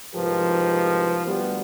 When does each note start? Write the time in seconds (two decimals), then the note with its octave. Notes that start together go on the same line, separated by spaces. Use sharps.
0.14 C2 G#2 F3 G4 A#4 B4
1.26 D2 G3 B3 G4